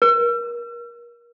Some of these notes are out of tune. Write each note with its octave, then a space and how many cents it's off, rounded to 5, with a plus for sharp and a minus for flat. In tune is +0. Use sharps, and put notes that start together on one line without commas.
A#4 +30